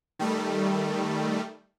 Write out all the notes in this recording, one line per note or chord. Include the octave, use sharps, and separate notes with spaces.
D#3 G3 A3